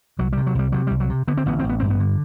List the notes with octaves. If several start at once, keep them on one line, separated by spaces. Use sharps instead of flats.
C2 F#3
C3 G3
F#3
C2 G3
C3 F#3
C2 G3
F#3
C3
D3 B3
C4
A1 B3
C4
A1
B3
G2 C4
B3
D3